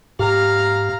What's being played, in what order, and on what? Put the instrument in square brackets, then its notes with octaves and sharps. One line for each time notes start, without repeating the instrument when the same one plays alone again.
[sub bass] G#2 [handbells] G4 [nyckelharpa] F5 A#5